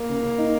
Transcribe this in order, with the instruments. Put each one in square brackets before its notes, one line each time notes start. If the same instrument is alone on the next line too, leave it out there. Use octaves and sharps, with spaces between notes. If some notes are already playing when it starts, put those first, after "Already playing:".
Already playing: [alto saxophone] A#3
[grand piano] C#3
C#3
D#4